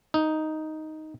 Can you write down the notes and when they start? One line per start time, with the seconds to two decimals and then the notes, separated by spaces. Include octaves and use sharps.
0.14 D#4